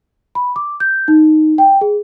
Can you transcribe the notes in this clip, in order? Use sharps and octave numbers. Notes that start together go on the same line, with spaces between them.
B5
D6
G6
D#4
G5
G#4